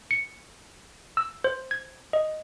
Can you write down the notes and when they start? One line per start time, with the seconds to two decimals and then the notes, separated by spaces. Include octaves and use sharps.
0.11 C#7
1.17 E6
1.44 C5
1.71 G#6
2.13 D#5